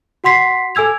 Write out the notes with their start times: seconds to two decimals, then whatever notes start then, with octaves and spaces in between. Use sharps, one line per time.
0.24 F#4 F#5 C6 B6 C7
0.75 A4 G#5 E6 G#6 F7